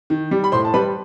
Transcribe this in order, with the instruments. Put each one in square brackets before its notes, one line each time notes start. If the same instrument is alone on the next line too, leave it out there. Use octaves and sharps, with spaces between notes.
[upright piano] D#3
G3
B5
A2 C5 C6
A5
G3 B4 B5